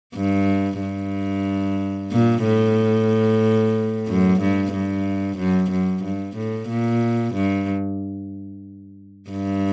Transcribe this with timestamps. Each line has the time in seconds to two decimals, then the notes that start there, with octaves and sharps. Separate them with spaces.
0.15 G2
0.81 G2
2.11 A#2
2.44 A2
4.08 F#2
4.40 G2
4.73 G2
5.38 F#2
5.71 F#2
6.04 G2
6.36 A2
6.69 A#2
7.35 G2
9.31 G2